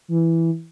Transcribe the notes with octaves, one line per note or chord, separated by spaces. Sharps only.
E3